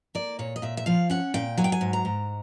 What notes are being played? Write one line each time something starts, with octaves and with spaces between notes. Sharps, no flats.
A#3 D5
A#2 C#5
D#5
A#2 E5
E5
F3 F5
C#4 F#5
A#2 G5
F#3 G#5
G5
G#5
G#2
A#5
G#2